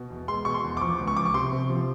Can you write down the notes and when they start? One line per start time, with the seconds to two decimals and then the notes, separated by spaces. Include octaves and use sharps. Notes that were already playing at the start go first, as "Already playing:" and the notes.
Already playing: B2
0.10 E2
0.28 G#3 C6
0.45 B2 C#6
0.54 C6
0.64 E2
0.77 D6
0.81 F3 C#6
0.99 C#2
1.07 C#6
1.16 F3 D6
1.25 C#6
1.34 C3 C6
1.52 C3
1.70 F3